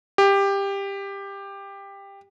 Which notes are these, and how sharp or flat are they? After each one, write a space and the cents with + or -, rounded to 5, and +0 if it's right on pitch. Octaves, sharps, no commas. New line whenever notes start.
G4 +15